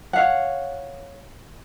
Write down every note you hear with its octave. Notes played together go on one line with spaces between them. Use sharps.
C#5 F5 F#5